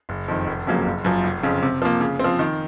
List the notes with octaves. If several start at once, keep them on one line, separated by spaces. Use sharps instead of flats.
F#1
F2 D#3
F1
F2 C#3 F#3 A#3
F#1
F#2 F3
F1
F2 C#3
C3
F3 A#3
C#3
F3 C4
D#3